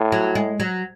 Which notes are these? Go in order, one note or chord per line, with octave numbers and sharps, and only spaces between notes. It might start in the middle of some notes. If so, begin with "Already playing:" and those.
Already playing: A2
F#3
G#3
F#3